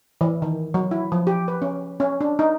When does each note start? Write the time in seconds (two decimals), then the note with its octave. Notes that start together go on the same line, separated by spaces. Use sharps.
0.21 E3
0.42 D#3
0.74 F#3
0.91 E4
1.12 F3
1.27 G4
1.48 B4
1.62 C#4
2.00 C#4
2.21 D4
2.39 D#4